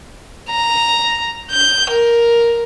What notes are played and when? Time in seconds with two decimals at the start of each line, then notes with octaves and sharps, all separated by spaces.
0.49 A#5
1.51 G6
1.91 A#4